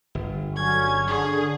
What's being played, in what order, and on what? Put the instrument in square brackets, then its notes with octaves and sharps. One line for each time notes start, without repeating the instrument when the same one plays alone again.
[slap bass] G1
[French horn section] D3 F#3 [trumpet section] C#4 [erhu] G#6
[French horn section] D3 [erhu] G#4